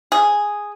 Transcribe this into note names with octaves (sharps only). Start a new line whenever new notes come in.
G#4